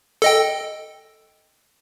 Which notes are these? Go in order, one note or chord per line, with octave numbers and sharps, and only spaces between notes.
A4 D#5 G5